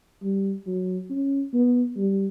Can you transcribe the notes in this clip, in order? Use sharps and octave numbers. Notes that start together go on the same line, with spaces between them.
G3
F#3
C#4
B3
G3